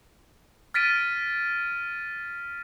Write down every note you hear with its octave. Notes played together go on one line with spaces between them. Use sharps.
F6 A6 B6 D7 D#7